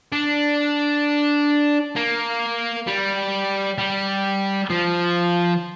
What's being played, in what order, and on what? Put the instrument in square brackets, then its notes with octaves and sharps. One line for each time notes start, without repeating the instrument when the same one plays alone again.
[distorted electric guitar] D4
A#3
G3
G3
F3